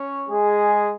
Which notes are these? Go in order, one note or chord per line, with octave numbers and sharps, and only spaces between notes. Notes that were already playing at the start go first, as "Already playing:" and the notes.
Already playing: C#4 C#5
G#3 G#4